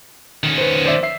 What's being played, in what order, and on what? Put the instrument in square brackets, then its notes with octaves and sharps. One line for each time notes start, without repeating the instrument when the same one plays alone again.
[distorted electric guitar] D#3 C#4
[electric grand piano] B4 C5
C5 D5 E5
E5 C7